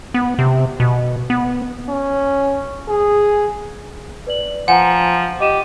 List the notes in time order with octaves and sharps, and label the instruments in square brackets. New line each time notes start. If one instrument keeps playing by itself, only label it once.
[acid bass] B3
C3
B2
B3
[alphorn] C#4
G#4
[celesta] B4 D5 F#7
[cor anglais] F3 [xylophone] F#5 [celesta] G#5 A#5
[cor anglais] G4 [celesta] D#5 D#7 E7